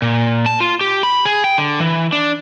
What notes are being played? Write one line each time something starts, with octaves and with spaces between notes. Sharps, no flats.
A#2
A5
F4
G4
B5
G#4
G5
D3
E3
D4